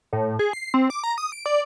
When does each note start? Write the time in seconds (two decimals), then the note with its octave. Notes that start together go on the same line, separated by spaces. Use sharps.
0.13 A2
0.39 G#4
0.53 C7
0.74 C4
0.90 D6
1.04 A#5
1.18 D#6
1.32 D7
1.46 D5